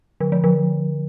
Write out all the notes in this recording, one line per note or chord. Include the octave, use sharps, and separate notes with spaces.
D3
F3
D3